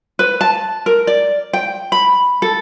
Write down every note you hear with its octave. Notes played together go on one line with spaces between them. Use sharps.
B4
A5
A#4
D5
G5
B5
A4